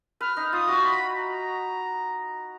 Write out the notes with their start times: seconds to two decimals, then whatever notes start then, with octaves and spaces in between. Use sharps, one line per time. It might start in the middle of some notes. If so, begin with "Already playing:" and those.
0.21 B4 F6
0.37 D#4
0.53 F4 D#6
0.68 F#4
0.84 B5
1.16 A#5